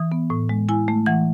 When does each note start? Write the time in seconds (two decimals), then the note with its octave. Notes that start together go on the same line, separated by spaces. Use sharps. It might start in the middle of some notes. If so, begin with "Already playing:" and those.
Already playing: E3 D#6
0.12 B3
0.30 A2
0.49 G#3
0.69 E4 G#5
0.88 A3
1.06 E3 F#5